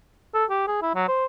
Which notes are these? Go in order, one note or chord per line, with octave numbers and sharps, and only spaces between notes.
A4
G4
G#4
E4
F#3
C5